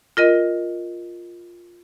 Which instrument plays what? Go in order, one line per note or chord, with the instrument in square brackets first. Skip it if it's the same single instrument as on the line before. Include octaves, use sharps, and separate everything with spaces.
[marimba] F4 A#4 D#5